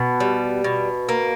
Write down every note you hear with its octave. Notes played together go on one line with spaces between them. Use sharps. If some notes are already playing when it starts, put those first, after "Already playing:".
Already playing: B2
G3
B2
A#3